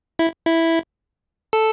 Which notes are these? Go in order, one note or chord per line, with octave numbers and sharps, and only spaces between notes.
E4
E4
A4